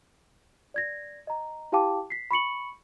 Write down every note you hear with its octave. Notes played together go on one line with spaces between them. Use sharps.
D5 G#6 A#6
D#5 A#5
E4 G4 F5 G5 A5 D6
B6 C7
B5 C#6 C#7 F#7